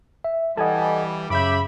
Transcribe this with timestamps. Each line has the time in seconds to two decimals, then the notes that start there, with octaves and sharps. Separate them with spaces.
0.24 E5
0.57 E3 G3 A4 D#5 F#5 G#5 A5
1.30 F#2 C#3 E5 B5 D6 G6